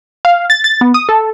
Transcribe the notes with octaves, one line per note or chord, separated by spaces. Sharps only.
F5
A6
A6
B3
D#6
A4